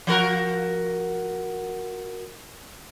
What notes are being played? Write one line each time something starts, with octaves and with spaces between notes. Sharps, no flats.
F3 F#4 A#4